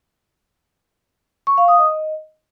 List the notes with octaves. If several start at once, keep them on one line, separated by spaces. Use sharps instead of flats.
C#6
F5
D#6
D#5